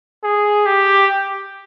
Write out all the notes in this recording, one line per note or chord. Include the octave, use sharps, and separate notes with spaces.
G#4
G4